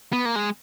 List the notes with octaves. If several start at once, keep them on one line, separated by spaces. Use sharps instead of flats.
B3
A#3
G#3